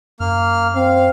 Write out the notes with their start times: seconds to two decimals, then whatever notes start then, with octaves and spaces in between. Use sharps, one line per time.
0.20 F#2 A#3 F6
0.75 C4 F5